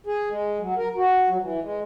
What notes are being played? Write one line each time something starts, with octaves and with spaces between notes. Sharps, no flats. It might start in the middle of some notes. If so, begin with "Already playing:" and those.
G#4
G#3
F#3
A#4
F#4
F#3
E3
G#3